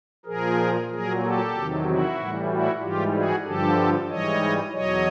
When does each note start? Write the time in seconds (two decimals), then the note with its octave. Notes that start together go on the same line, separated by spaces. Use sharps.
0.26 A#2 F3 G#4 A#4
0.90 A#2 F#3 G#4 A#4
1.22 G4 A4
1.54 E2 C3 D#3 F#3
1.85 E4 F#4
2.17 A2 E3 G3
2.49 E4 F#4
2.81 G#2 E3 G3 F4 G4
3.13 F#4 G#4
3.44 G2 D3 F3 G4 A4
4.08 G#2 E3 G3 C#5 D#5
4.72 E2 B2 F#3 C#5 D#5